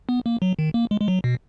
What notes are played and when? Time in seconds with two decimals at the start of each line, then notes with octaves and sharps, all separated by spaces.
0.09 B3
0.26 A#3
0.42 F#3
0.59 D#3
0.74 A#3
0.91 G#3
1.01 G#3
1.08 F#3
1.24 B2